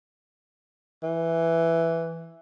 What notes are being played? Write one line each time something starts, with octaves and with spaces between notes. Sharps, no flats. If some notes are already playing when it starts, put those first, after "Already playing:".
E3